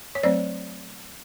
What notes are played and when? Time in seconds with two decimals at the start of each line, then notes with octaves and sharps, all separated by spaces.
0.15 C#5
0.23 F#3 A3 C4 C5 D5